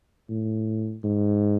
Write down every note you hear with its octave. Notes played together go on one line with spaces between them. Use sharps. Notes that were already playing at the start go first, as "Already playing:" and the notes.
A2
G#2